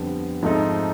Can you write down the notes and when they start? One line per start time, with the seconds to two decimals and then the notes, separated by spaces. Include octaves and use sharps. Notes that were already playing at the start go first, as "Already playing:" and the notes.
Already playing: F2 D3 G3 B3
0.43 G#2 F3 A3 C4 D#4